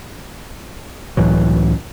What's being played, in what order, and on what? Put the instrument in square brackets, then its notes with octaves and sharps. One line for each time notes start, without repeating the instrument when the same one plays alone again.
[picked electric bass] C#2 A2 E3 F#3